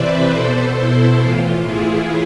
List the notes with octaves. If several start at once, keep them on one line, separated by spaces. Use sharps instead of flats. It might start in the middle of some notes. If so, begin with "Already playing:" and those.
Already playing: C3 E3 B4 C5 D5 E5
B2 A4 C5
E4
A2 E3 F4
E4 G#4